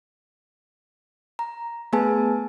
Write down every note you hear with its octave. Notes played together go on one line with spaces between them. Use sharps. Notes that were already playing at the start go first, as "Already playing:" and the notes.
A#5
A3 B3 G#4 B4 G#5 A5